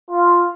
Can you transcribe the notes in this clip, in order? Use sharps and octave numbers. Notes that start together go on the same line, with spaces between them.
F4